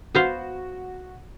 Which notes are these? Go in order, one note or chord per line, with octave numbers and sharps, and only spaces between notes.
B3 F#4 C5 F5